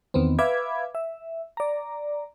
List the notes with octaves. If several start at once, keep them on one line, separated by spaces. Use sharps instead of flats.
E2 D#3 B3 C4
B4 E5 F5 B5 D6 G#6
E5
D5 A#5